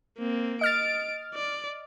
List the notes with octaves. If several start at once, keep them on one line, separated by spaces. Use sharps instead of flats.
A#3 C4
D#5 F6 A6 D7
D5